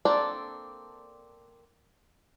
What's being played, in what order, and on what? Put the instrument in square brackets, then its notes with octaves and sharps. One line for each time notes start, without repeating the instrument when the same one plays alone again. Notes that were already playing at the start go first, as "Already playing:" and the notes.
[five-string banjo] A#3 C4 D4 A4 D5